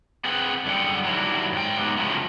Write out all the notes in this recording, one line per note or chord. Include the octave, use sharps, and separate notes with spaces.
C4 G#4 B4 F#5 G5
F#2 D3 G3 G#4 F#5 G5
D#3 F#3 G3 D4 E4
G#2 G5
F#3 G#3 B3 C#4 D#4 G4
C#3 F3 F#3 A3 A#3